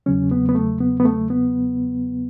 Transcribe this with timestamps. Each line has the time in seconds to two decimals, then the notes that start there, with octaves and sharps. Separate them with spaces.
0.06 E2 C#3 F#3 C#4
0.31 B3
0.49 B3
0.55 A3
0.80 B3
1.00 B3
1.05 A3
1.30 B3